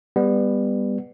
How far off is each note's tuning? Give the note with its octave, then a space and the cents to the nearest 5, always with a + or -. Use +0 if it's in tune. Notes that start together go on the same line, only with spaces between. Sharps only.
G3 +25 B3 +5